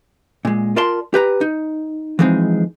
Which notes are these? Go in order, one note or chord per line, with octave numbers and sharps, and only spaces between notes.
A#2 G#3
F4 A#4 D5 A5 C6
G4 B4 A#5
D#4
E3 F3 G#3 C4 D#4